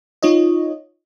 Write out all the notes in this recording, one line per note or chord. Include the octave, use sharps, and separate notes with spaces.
D#4 F4 C#5 D#5